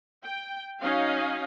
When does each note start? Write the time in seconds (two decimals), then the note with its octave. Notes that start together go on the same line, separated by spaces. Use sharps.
0.24 G5
0.81 F#3 C#4 D#4 D#5 F5